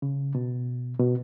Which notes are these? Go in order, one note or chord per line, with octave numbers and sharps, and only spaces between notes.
C#3
B2
B2